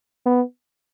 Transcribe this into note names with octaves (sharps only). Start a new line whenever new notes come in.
B3